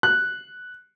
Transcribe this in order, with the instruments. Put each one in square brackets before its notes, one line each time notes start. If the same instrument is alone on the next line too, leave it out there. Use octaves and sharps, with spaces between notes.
[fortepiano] F#6